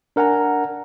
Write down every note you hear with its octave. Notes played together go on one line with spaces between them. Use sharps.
D4 A#4 F#5 G#5 A#5